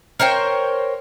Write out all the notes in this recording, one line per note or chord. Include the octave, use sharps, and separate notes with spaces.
A#4 C5 C#5 G5